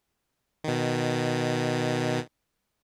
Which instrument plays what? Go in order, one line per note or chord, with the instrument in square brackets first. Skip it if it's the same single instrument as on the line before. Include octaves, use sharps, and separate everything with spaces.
[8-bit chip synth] B2 D#3